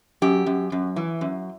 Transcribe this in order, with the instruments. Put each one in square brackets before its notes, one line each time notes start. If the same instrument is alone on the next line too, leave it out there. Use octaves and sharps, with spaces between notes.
[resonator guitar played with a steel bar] F#2 G4
F#2
F#2
E3
F#2